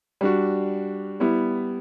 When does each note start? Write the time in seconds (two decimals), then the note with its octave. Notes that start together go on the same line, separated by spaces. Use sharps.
0.21 G3 D4 F#4
1.20 G3 B3 E4